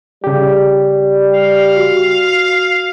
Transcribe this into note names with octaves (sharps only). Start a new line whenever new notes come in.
C#3 G3 G4
F5
F#4